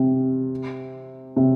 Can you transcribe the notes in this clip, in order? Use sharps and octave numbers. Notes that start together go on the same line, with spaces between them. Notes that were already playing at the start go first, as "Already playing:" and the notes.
Already playing: C3
C3